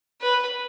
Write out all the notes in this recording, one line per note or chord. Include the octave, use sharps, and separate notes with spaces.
B4